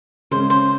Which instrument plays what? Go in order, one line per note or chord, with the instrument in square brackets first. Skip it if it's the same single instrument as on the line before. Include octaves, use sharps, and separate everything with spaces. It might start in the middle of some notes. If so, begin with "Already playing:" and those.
[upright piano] C#3 G#3 C#4 [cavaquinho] C5
[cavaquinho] C5